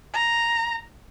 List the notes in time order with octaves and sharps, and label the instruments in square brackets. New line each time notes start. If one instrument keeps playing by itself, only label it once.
[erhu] A#5